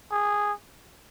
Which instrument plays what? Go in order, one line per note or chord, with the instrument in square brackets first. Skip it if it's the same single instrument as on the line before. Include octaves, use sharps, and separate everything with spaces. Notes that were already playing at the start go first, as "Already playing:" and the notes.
[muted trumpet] G#4